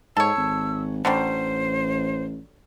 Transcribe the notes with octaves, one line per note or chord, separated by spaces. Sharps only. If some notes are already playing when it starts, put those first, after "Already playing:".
G#2 A4 C#5 E6
G#1
A1 D3 F#3 G3 C5